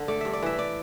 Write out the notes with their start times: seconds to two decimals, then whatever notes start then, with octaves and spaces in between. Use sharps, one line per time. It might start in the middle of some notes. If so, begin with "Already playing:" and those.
Already playing: D3
0.08 A3 D5
0.21 G2 E5
0.33 D5
0.42 E3 E5
0.59 D5